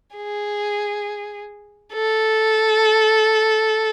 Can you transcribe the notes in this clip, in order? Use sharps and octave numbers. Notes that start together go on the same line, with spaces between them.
G#4
A4